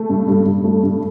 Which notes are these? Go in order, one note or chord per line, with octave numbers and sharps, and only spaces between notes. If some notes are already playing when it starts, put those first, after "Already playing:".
Already playing: A3
G2
G2
G2
A3
G2